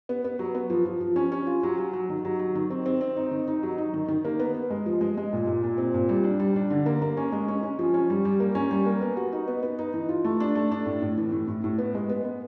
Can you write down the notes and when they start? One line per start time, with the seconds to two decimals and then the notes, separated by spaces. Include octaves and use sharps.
0.09 B3
0.24 B3
0.39 F#3
0.55 B3
0.70 F3
0.85 F3
1.00 F3
1.16 C#4
1.32 C#4
1.47 F4
1.63 F#3
1.78 F#3
1.93 F#3
2.09 D#3
2.25 F#3
2.39 F#3
2.55 D#3
2.70 C4
2.86 C4
3.01 C4
3.17 D#4
3.31 D#3
3.48 D#4
3.63 F#3
3.78 D#4
3.94 D#3
4.08 D#3
4.25 A#3
4.39 B3
4.55 B3
4.70 G#3
4.86 F3
5.01 G#3
5.17 G#3
5.33 A#2
5.47 A#2
5.64 A#2
5.78 C4
5.94 A#2
6.09 G3
6.24 D4
6.40 G3
6.56 D4
6.70 D3
6.86 A#3
7.02 A#3
7.17 C#4
7.32 G#3
7.48 C#4
7.63 C#4
7.79 F3
7.94 C#4
8.10 G3
8.25 G3
8.40 A#3
8.55 C#4
8.71 G3
8.86 A#3
9.01 B3
9.17 F#4
9.33 D#4
9.48 B3
9.63 B3
9.79 D#4
9.94 E3
10.09 F4
10.25 A3
10.40 D4
10.55 A3
10.72 D4
10.86 A2
11.02 A2
11.17 E3
11.32 A2
11.48 A2
11.64 A2
11.78 B3
11.95 G#3
12.09 B3
12.24 B3